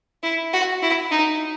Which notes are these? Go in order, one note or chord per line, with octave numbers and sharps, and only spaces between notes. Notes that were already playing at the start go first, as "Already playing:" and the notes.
E4
F#4
E4
D#4